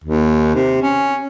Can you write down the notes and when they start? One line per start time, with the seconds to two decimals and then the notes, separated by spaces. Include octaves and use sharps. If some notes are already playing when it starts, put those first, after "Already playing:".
0.04 D#2
0.55 C3
0.82 C#4